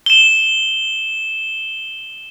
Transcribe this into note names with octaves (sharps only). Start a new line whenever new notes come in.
E7 G7